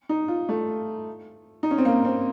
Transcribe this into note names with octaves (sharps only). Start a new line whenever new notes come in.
D#4
F4
A3
D#4
C#4
C4
A#3
C4